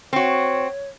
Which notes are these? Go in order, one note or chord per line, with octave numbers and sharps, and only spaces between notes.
C4 F#4 C#5